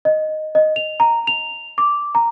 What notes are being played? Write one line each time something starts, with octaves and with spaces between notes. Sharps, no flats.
D#5
D#5
F7
A#5
F7
D6
A#5